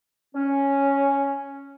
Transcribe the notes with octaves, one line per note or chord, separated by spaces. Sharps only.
C#4